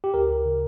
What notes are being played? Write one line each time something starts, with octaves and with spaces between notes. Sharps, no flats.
G4
D2 A#4
D2
C#3